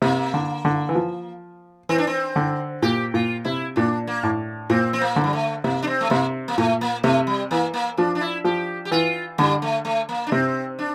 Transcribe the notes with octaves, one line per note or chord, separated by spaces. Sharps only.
C3 A#3
D3
D3
E3
F3
E3 C4
D4
C4
D3
A#2 G4
A#2 F4
C3 E4
A#2 D4
A#3
A2
A#2 C4
C4
A#3
D3
G3
A3
C3 A#3
D4
C4
A3
C3 A#3
A#3
A#2 A3
A#3
C3 A3
G3
E3 A#3
A#3
F3 D4
D4
E4
F3 G4
G4
E3 F4
D3 G3
A3
A3
A#3
D4
C3 C4
D4